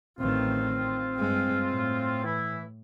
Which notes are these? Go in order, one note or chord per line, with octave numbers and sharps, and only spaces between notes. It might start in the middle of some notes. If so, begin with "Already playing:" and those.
A1 D#3 C4 F4
G2 G#3
A2
E3 E4